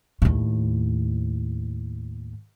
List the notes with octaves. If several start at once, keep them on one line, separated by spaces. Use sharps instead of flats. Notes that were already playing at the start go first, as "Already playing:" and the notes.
D#2 A2